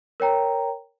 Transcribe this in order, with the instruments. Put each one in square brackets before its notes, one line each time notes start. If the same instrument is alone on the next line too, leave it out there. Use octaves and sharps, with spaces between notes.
[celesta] A#4 C#5 G5 A#5